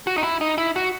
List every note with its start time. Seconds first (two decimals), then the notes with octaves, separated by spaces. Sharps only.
0.07 F#4
0.18 D#4
0.24 E4
0.41 D#4
0.58 E4
0.76 F#4